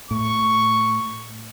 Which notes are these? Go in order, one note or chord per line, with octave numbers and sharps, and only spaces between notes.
A2 C#6